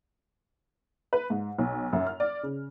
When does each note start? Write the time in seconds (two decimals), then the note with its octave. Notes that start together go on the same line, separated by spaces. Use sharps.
1.13 B4
1.30 G#2
1.59 B1
1.93 F#2
2.07 F6
2.20 D5
2.43 C#3